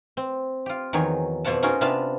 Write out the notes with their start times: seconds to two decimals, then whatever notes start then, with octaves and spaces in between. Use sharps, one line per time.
0.17 C4
0.66 F4 G4
0.93 E2 D#3 F#3 G#4 C#5
1.45 F2 B2 F3 C#5 F#5 A5
1.63 C#4 D#4 F4 F#4 G#4 A#4
1.81 C3 B3 D4 F4 F5 A5